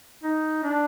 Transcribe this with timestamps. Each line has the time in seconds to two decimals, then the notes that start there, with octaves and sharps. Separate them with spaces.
0.23 D#4
0.64 D4